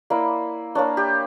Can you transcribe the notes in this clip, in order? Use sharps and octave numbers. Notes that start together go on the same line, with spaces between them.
A#3 E4 D5
A#3 D4 C#5
G4